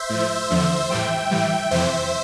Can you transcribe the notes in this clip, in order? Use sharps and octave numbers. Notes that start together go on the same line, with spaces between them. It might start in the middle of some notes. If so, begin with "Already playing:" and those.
Already playing: C5 E5
A2 F3
E2 D3 F3
A2 E3 G3 E5 G5
A2 E3 G3
F2 C3 E3 C5 E5